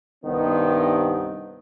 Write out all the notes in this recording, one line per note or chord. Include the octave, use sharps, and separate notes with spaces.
C2 G2 D#3 B3 C4